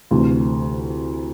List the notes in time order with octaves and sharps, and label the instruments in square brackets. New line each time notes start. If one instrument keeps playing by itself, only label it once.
[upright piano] D2 C3 E3